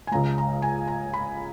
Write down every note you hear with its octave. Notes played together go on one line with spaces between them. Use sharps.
G#5
C#2 C#3 G#3 A#5
A#5
G#5
A#5
B5